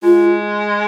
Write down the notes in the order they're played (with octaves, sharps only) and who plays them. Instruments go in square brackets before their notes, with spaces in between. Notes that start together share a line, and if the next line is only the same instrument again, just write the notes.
[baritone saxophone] G#3 [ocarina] F4